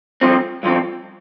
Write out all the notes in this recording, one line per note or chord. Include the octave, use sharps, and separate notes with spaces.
G2 F3 C4
G2 F3 C4